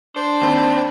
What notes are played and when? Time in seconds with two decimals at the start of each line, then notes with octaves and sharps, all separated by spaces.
0.16 D4 C5
0.41 D#2 C4 B5